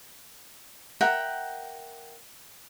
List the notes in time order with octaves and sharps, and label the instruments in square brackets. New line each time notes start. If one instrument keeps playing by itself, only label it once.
[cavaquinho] A#4 E5 F#5 G5